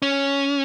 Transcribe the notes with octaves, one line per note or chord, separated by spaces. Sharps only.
C#4